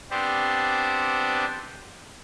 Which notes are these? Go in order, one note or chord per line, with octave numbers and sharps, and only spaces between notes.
B3 C4 D4 G4 C5